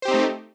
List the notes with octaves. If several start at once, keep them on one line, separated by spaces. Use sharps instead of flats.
A3 C4 D#4 G4 C5